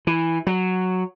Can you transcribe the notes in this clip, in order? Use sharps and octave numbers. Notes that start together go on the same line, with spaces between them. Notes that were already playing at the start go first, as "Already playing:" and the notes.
E3
F#3